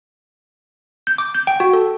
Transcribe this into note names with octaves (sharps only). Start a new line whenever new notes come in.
G6
D6
G6
G5
F#4
A4